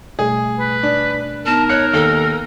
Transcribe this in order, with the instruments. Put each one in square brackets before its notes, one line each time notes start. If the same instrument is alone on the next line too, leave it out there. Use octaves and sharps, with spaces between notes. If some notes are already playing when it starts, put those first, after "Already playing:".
[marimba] B2 G3 A3 [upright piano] G#4
[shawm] B4
[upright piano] D4
[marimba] B3 D#4 [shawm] A#4 [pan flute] A5
[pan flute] C#5 [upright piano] F#6 C#7
[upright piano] D#2 [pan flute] A4